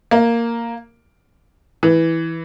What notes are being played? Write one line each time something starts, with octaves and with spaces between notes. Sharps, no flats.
A#3
E3